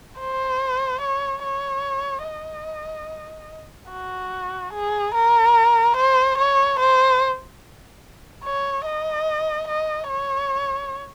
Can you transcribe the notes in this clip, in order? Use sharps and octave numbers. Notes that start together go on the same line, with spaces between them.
C5
C#5
C#5
D#5
F#4
G#4
A#4
C5
C#5
C5
C#5
D#5
D#5
C#5